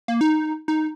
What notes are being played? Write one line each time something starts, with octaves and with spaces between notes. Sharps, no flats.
A#3
D#4
D#4